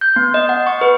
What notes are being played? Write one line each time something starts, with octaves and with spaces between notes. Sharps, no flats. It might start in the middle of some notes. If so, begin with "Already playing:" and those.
G6
B3
D#5
F#5
C#6
B4